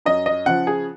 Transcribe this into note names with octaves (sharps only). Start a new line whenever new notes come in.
F#2 D#5
D#5
C#3 F3 F#5
G#4